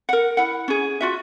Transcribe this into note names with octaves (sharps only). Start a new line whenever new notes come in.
A#4 F#5
E4 F#5
C#4 G#4
F4 F#4 E5